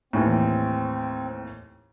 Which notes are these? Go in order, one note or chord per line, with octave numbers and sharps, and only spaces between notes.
D#2 A2 E3 C4